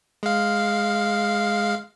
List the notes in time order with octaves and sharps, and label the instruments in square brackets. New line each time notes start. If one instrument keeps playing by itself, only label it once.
[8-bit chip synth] G#3 F5